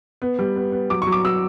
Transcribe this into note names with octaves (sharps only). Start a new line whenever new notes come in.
B3
G3
B3
B3
F#3 D6
C#6
F#3
D6
F#3 E6